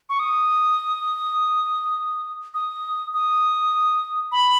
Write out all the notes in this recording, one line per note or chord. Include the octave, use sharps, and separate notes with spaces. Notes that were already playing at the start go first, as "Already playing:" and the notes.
C#6
D#6
D#6
D#6
B5